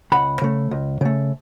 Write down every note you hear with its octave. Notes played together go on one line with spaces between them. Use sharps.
C#2 F#5 B5
C#3 A3
C#2
C#3 A3